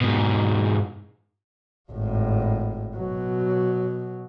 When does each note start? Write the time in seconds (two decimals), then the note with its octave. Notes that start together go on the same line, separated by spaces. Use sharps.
0.01 G#2 B2
1.91 G#1 A2
2.96 B2 F#3